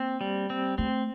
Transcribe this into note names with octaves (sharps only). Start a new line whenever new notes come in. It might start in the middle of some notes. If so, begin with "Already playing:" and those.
Already playing: A#3 C4
G3
C4
A3 C4